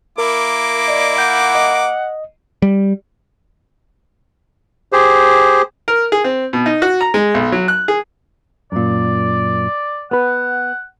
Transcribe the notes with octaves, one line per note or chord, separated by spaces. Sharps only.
A#3 E4 A#4 D6
D5 D#5
F#5 G6
D#5
G3
G4 G#4 C5
A#4
G#4
C4
B2
D#4
F#4
A#5
G#3
B1
F#3
F#6
G#4
F#2 A#2 D5
B3 B4 F#5